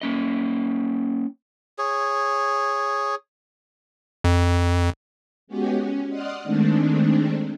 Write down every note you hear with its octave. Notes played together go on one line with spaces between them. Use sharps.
A#3 C#4 D#5
G#4 C#5
F2
G#3 B3 C#4 F#4 G4
C#4
D5 D#5 F#5 C6 D#6 F6
D#3 G#3 A3 C4 D4